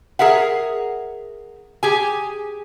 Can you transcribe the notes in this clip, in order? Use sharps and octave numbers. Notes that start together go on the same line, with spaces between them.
G#4 A#4 E5 F#5
G4 G#4 G#5